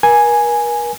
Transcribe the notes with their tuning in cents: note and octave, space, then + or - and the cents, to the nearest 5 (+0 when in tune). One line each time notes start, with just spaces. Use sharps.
A#4 +40 G#5 +0